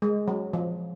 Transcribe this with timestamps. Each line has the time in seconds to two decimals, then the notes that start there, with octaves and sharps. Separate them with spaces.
0.02 G#3
0.28 F#3
0.53 F3